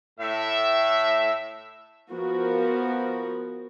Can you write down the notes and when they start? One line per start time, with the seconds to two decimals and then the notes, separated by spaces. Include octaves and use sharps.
0.20 A2 E5
2.11 F3 B3 F#4 A#4